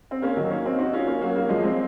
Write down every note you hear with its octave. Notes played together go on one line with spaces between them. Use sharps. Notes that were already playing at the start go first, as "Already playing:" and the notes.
C4
A#3 C#4
D#3 F#3
A#3 C#4
C4 D#4
D#4 F#4
C#4 F4
A#3 C#4
F#3 A#3
F#3 A#3
F3 G#3
G#3 C4